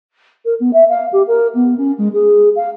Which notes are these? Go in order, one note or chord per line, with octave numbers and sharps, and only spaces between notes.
A#4
B3
E5
F5
G4
A#4
B3
C#4
G#3
G#4
F5